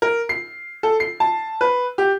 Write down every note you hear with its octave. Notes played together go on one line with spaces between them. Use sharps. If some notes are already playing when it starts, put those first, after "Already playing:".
A#4
C7
A4
C7
A5
B4
G4